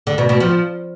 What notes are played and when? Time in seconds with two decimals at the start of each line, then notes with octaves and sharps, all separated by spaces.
0.07 D3
0.18 B2
0.29 B2
0.40 F3